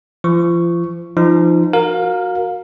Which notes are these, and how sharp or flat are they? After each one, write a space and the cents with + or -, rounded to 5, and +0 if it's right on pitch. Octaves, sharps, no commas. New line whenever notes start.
F3 -35 C#6 +0
F3 -25 D#4 -15
F#4 +0 A#4 -10 F5 +25